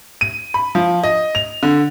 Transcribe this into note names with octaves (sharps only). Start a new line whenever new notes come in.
D#7
B5
F3
D#5
F7
D3